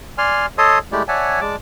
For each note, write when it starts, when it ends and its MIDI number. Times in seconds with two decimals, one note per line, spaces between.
0.18 0.46 74
0.18 0.46 80
0.18 0.46 84
0.18 0.46 89
0.58 0.79 69
0.58 0.79 73
0.58 0.79 75
0.58 0.79 81
0.58 0.79 84
0.58 0.79 87
0.92 1.03 56
0.92 1.03 57
0.92 1.03 64
0.92 1.03 67
0.92 1.03 74
1.08 1.40 73
1.08 1.40 74
1.08 1.40 76
1.08 1.40 78
1.08 1.40 80
1.08 1.40 81
1.41 1.56 56
1.41 1.56 74
1.41 1.56 81
1.41 1.56 86